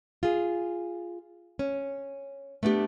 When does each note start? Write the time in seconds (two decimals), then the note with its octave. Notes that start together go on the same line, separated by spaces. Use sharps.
0.23 F4 G#4
1.59 C#4
2.63 A3 B3 D4 D#4 G4